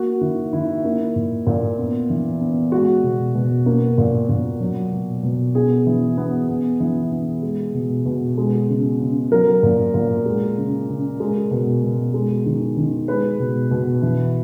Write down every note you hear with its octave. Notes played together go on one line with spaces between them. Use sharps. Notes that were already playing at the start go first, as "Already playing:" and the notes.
Already playing: A#3 F#4
D#3 E4
D#3 E4
A#3
A#2
A#2
B3
E3
B3
G#3 F#4
B2
B2
A#3
A#2
A#2
F#3
B2
B2
B3 G#4
E3
B3
B3
E3
B3
G#3
B2
B2
G#3
C#3
C#3
F#3 A#4
A#2
A#2
G#3
C#3
C#3
G#3
B2
B2
G#3
D#3
D#3
G#3 B4
B2
B2
E3